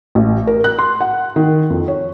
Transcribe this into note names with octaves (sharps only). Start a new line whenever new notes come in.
A1
A#4
F#6
C6
F#5
D#3
F2
C#5